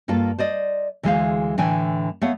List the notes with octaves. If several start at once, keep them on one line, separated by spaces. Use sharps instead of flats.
G2 A#3 F4 A4
C5 D5 D#5
D2 E3 G#3 G#4 C5 F5
A2 D3 E3 G5 G#5
A3 B3 C#5 F5 F#5